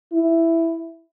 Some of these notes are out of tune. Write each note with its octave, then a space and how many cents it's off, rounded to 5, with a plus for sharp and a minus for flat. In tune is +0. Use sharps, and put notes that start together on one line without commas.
E4 +5